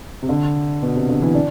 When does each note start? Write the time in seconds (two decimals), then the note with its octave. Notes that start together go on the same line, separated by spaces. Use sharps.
0.23 C3
0.29 D3
0.83 B2
0.96 C3
1.09 D3
1.22 E3
1.35 D4